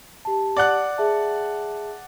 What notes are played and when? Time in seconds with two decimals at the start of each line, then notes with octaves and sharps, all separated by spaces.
0.25 G4 A5
0.57 D5 F#5 F#6
0.98 G#4 E5 A5